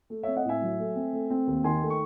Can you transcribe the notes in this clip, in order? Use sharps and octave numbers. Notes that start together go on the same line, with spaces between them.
A3
C4 C#5 E5
D#5 F#5
A2 E5 G#5
F#3
A3
C4
A3
C4
D#2
D#3 G#5 C6
A3
C#6